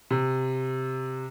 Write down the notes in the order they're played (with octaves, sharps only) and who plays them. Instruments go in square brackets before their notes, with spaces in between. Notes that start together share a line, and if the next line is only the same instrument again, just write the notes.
[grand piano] C3